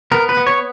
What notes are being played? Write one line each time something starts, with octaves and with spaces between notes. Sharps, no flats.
B3 A#4
B4
B3
C#5